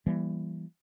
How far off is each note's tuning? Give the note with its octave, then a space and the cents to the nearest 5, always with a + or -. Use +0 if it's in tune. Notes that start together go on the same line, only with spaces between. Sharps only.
E3 +20 G3 +0 A#3 +40